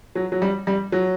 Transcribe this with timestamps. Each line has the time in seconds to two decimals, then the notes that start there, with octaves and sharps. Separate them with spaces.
0.16 F#3
0.32 F#3
0.42 G3
0.67 G3
0.92 F#3